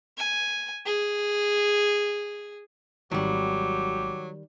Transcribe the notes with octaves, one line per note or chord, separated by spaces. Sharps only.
G#5
G#4
G#1 D#3 F#3 G3 G4